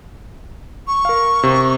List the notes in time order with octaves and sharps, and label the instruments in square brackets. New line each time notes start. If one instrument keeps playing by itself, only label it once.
[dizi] C#6
[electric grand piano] A#4 F5
C3